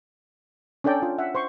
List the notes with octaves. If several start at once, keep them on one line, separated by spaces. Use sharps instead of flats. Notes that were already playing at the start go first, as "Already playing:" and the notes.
C#4 D4 A4 D5 G5
F4
E5 F#5
C5 C6 C#6